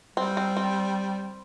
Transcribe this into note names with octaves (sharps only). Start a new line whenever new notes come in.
G3 C4
C4
C4